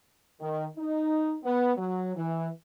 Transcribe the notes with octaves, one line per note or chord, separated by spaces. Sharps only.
D#3
D#4
B3
F#3
E3